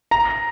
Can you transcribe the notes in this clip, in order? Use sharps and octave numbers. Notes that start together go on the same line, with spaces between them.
A#5